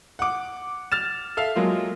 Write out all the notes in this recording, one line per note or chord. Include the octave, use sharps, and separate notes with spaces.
F#5 D6
F6 A6 E7
A4 E5 F5
F#3 G#3 A#3 F4